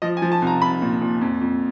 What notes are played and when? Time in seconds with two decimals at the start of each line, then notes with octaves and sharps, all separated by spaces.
0.02 F3 D#5
0.17 G#5
0.22 F3
0.32 A5
0.42 C2
0.47 A#5
0.61 C2 B5
0.82 A#2
1.01 A#2
1.21 F2
1.41 F2